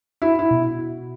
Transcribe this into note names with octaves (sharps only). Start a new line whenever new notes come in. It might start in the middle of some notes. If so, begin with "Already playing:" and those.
E4 F#4
E4
B2